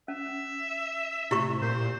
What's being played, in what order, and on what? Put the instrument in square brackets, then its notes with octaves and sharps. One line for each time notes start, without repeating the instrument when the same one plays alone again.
[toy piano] C#4 [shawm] E5
[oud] A2 C3 [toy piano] E4 G4 C#6
[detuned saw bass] A#2 [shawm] C5